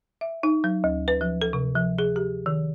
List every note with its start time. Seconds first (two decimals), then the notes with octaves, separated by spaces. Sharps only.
0.21 E5
0.43 D#4
0.64 F#3
0.84 D2
1.08 B4
1.21 F3
1.41 A4
1.53 C3
1.75 F3
1.99 G#4
2.16 G4
2.46 D#3